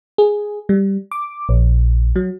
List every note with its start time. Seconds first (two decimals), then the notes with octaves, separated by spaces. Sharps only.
0.18 G#4
0.69 G3
1.12 D6
1.49 A#1
2.16 F#3